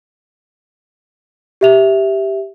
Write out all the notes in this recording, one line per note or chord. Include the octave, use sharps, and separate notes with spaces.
G4 E5 F7